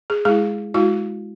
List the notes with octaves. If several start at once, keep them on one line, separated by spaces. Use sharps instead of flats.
G#4
G#3 E4 G#4
G#3 E4 F#4